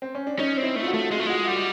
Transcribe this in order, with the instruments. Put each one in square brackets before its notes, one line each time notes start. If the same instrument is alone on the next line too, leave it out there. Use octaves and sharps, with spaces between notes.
[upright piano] C4
C#4
D4
[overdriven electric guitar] C#4 [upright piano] D#4
[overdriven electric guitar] C4
[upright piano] E4
[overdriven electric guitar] A3
[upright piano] F4
F#4
[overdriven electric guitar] A3
[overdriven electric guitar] G#3 [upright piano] F4
[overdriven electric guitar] A3
[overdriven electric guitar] G#3 [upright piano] F#4
[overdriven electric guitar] G3 [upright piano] F#4